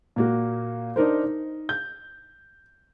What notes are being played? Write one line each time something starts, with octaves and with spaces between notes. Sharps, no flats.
A#2 A#3 F#4
D4 D#4 A#4 C5
D#4
G6